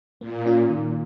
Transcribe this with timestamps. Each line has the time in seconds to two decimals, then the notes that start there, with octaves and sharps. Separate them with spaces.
0.20 A#2 A#3
0.46 C#4 F4
0.69 D#3